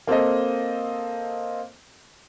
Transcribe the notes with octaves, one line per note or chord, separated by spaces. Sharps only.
A#3 C4 A4 C5 D#5